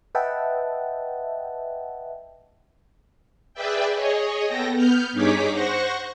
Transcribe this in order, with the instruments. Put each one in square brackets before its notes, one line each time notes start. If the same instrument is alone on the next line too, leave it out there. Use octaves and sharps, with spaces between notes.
[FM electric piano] B4 D#5 E5 F#5 G5 A5
[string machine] G#4 B4 D5 E5 G5
G#4 C#5 D#5
B3 A4 G5 A#6
B3 F6 G6
G2 D#4 G#4 C#5 D6 B6
C5 F#5 C#6 A#6